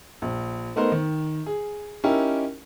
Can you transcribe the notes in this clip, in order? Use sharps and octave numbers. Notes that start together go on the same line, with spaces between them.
A#1
A3 B3 D#4 A#4 C5
D#3
G#4
C#4 D#4 E4 G4 A#4